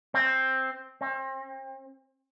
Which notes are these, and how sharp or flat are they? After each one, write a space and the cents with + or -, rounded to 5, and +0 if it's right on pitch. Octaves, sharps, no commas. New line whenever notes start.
C4 +5
C4 +35